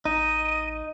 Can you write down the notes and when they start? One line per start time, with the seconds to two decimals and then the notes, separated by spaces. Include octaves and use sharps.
0.05 A1 D#4 D#5 D#7